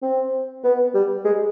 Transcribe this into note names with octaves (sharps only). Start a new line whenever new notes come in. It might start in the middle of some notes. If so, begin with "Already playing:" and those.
C4
B3
G3
G#3